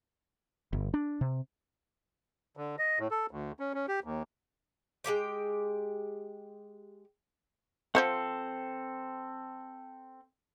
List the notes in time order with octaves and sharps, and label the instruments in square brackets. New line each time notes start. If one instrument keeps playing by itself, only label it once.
[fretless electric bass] G1
D4
C3
[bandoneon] D3
D#5
A2
A4
D2
C#4
C#4
G4
D#2
[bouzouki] G#3 B3 G4 G5
[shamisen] F3 C5 F#5 [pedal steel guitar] C4 A4